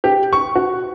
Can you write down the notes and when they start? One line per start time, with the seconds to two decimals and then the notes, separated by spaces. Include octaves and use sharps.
0.04 G4
0.33 C#6
0.55 F#4